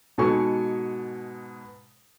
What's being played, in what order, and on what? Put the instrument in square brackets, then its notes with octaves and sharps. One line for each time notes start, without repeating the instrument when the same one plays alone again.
[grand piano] G#2 B2 A4 G#5 C#6